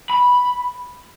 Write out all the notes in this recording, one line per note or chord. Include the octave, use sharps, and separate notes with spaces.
B5